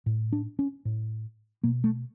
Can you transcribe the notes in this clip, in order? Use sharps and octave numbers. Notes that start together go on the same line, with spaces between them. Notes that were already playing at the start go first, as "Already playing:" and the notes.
A2
D4
C#4
A2
B2 A#3
A3